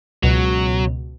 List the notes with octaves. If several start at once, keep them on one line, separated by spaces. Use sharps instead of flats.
C#2 B2 F#3